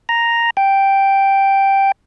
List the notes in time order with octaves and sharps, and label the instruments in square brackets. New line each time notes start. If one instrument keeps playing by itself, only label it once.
[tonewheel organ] A#5
G5